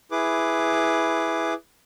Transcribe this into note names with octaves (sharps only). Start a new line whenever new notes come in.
E4 G#4 B4 D6